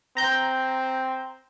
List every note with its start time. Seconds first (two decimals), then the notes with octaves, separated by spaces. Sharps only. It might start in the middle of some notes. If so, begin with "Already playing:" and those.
0.17 C4 A#5 G6